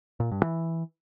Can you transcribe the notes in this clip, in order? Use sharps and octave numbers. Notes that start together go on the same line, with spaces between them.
A#2
G2
E3